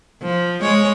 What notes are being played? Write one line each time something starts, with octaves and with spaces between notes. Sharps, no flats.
F3
G#3 C#5